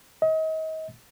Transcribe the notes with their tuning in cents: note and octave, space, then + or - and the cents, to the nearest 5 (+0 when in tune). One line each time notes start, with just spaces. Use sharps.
D#5 +35